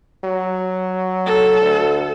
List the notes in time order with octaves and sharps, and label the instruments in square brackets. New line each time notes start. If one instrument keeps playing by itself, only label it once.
[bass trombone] F#3
[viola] A4
[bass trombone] D2